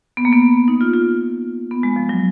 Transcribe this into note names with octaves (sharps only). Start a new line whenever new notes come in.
B3
A#3
B3
D#4
F4
F4
B3
G#3
F3
F#3